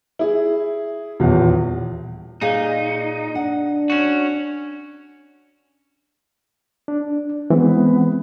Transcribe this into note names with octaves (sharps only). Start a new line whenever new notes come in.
E4 G#4
D#1 E2
A#2 D#4 G#4 F5
D4 F#5
C#4 F#4
D4
E3 G#3 B3 C4